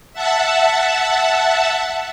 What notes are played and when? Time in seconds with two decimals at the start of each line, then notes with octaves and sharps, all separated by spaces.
0.13 E5 F#5 A5